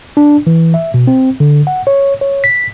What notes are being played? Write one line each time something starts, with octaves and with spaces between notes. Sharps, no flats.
D4
E3
E5
B2
C4
D3
F#5
C#5
C#5
B6